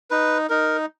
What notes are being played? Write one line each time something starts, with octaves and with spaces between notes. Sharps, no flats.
D#4 B4
D#4 A#4